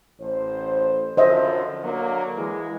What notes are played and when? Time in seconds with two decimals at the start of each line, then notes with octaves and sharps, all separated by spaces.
0.20 A1 C5
1.17 F#2 D3 F3 C5 D#5 E5
1.84 D3 F#3 A#3
2.37 E3 G#3